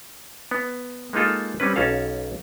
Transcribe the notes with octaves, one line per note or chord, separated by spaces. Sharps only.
B3
G#3 A#3 D#4 F4 A4
G3 C4 C#4 B4
B1 C#4 A4 F5